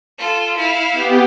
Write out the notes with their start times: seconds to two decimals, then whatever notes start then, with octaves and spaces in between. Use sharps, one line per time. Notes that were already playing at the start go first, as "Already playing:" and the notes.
0.18 F4 A4
0.56 E4 F5
0.92 B3 G4